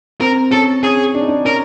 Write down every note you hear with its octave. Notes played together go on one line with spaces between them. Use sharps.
C4 A#4
C#4 A4
C#4 G#4
D4
D#4
D4
C#4 A#4